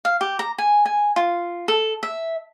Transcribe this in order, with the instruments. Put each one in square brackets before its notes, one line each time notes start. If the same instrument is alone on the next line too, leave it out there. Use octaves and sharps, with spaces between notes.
[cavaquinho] F5
G4
A#5
G#5
G#5
F4
A4
E5